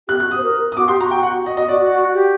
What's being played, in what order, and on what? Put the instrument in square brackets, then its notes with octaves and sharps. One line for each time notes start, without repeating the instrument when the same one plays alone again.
[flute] G4 [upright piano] F#6
[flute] F#4 [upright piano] F#6
[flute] G4 [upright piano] D#6
[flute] C5
A#4
[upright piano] D#6
[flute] F#4 [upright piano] D6
[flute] G4 [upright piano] C6
[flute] F#4 [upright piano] A#5
[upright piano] G5
F#5
D#5
[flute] F#4 [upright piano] D#5
[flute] F#4 [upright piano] D5
[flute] F#4
G4